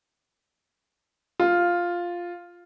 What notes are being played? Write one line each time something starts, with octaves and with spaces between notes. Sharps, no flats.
F4